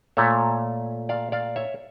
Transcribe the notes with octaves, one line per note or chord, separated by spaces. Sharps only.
A#2 A3 C#5 E5
D5 F5
D5 F5
C#5 E5